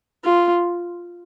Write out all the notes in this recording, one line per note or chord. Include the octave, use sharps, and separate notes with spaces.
F4